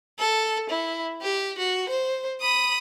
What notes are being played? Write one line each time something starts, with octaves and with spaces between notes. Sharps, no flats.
A4
E4
G4
F#4
C5
B5 D#6